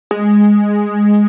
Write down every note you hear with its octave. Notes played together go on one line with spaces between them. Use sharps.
G#3